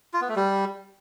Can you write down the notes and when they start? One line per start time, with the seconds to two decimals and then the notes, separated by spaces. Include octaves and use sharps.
0.14 F4
0.21 B3
0.28 A3
0.36 G3